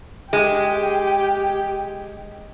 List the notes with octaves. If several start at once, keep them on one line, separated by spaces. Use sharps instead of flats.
G#3 G4 G5